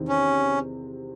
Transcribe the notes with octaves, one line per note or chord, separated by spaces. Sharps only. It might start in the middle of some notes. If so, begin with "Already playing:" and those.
Already playing: E2 C3 D#3
C#4